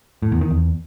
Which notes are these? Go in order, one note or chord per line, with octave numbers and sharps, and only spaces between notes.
A2
E2
D#3
E2